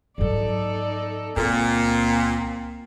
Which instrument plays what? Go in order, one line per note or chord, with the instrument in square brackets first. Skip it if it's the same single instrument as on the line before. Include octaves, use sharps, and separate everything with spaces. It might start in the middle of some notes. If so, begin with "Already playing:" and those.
[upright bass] G#2 F#3 [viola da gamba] D#4 A4 D5
[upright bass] C#2 [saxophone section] A#2 [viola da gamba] A#3 C4